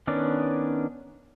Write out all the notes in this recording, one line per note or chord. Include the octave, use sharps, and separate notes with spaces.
D#3 B3 C#4 D4 D5